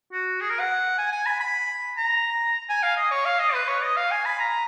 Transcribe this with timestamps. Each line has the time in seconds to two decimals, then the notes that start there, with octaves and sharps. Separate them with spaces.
0.12 F#4
0.41 G#4
0.50 A#4
0.60 F#5
0.98 G#5
1.12 G#5
1.26 B5
1.40 B5
1.97 A#5
2.69 G#5
2.82 F5
2.97 D#5
3.11 C#5
3.25 F5
3.39 D#5
3.53 B4
3.68 C#5
3.82 D#5
3.97 F5
4.11 G#5
4.25 B5
4.39 A#5